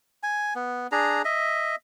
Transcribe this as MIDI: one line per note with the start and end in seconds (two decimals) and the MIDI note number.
0.23 0.54 80
0.55 0.87 59
0.92 1.22 62
0.92 1.22 68
0.92 1.22 82
1.25 1.75 75
1.25 1.75 76